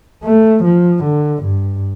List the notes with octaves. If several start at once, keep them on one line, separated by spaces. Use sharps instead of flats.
A3
F3
D3
G2